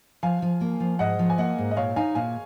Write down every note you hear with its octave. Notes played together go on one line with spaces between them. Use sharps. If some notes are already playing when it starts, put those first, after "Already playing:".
F3 F5 G#5
F3
A#3
F3
G#2 D#5 F#5
F3
G#5
A#3 D#5 F#5
G#2
D#5
A#2 C#5 F5
D#4 F5 G#5
A#2 F5 G#5